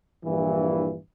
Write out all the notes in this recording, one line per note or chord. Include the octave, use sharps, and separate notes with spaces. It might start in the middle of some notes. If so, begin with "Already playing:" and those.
A#1 G2 E3